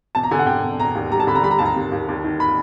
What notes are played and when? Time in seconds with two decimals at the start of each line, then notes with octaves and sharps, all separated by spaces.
0.15 E1 A5
0.23 A#5
0.31 D3 G#5
0.39 F#5
0.47 D3 G5
0.63 E1
0.79 E1 A#5
0.95 D#2
1.11 G3 A#5
1.20 A5
1.27 D3 B5
1.35 A#5
1.43 G3 B5
1.51 A#5
1.59 D#2 A5
1.65 A#5
1.76 D#2
1.92 D#2
2.08 D#2
2.24 D#3
2.40 B5